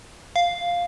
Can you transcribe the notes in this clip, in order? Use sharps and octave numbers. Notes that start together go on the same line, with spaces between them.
F5